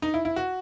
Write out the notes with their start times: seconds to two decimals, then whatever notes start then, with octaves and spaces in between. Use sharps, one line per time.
0.02 D#4
0.14 E4
0.25 E4
0.36 F#4